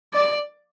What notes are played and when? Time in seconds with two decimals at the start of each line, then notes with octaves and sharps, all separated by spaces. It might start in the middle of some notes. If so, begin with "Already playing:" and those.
0.13 D5